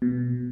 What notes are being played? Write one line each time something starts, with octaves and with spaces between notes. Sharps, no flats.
B2